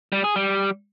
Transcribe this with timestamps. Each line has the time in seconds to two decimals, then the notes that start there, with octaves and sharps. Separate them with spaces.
0.12 G3
0.24 G#4
0.36 G3